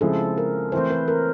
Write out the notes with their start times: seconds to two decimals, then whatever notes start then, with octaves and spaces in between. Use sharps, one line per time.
0.01 C#3 F3 G#3 C4 E4 A4
0.38 A#4
0.72 E3 A3 C4 C5
0.91 B4
1.08 A#4